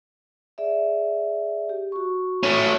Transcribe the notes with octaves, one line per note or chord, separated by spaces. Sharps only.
G#4 D5 E5
G4
F#4 C#6
A3 C#4